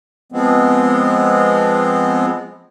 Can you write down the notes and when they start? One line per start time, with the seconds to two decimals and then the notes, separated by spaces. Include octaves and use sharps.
0.32 F3 G#3 B3 C4